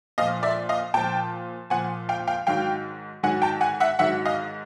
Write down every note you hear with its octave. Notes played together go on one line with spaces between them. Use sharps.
A#2 F3 D#5 F5
D5 E5
D#5 F5
A#2 F3 G5 A5
A#2 F3 F#5 G#5
F5 G5
F5 G5
G#2 D#3 F#3 F5 G5
G#2 D#3 F#3 F#5 G#5
G5 A5
F#5 G#5
E5 F#5
G#2 D#3 F#3 E5 F#5
D#5 F5